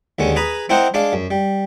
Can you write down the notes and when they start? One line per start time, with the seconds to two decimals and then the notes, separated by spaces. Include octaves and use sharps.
0.19 D#2 D3 G#3 C#4
0.36 G#4 B4 A#5 B5 D#6
0.69 C4 E4 A#4 C5 D#5 F#5
0.94 G#3 D4 D5 F5
1.13 F#2
1.31 G3